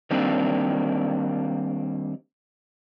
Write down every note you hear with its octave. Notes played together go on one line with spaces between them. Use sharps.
D#3 G3 A#3 C4 D4